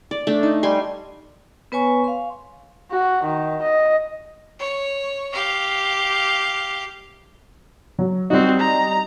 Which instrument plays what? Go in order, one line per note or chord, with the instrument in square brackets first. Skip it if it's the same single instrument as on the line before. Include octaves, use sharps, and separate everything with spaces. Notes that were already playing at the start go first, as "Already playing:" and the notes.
[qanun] D5
A3 D4
D#4
G3 G#5 C6
[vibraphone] B3 B4 C#5 G#5 C#6
F5 C6
[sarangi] F#4
D#3
D#5
[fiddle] C#5
G4 F5
[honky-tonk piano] F#3
[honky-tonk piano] G3 D#4 [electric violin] C4 F#4
[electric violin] A#5